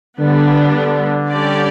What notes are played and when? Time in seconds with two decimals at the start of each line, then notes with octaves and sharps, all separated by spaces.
0.20 D3 G3 B3 D4
0.75 D3
1.30 G3 C#4 G4 D5